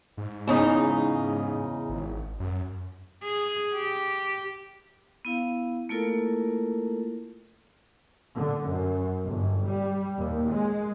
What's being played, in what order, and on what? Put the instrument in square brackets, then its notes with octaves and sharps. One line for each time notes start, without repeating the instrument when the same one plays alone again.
[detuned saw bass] G#2
[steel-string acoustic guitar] E2 C#3 D#4
[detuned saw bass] G#1
F#2
[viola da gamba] G#4
G4
[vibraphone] B3 E4 F5
A3 A#3 E4 F4 A4 A#4
[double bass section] D3
F#2
G1
G3
D#2
G#3